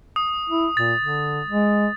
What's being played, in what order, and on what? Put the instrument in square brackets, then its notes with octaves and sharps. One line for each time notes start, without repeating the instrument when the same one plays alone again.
[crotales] D#6
[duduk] E4
[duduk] A#2 [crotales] A6
[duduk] D3
G#3